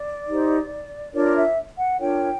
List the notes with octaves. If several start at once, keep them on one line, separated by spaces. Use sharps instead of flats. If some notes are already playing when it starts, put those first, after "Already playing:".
Already playing: D5
D#4 G4 C5
D4 F4 A#4 C#5 D5
E5
F#5
D4 F4 A#4 C#5 G5